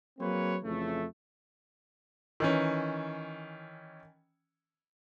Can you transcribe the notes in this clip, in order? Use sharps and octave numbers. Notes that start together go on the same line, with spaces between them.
F#3 A#3 C4 G#4 B4 C#5
F2 C#3 E3 A3
D#3 E3 C#4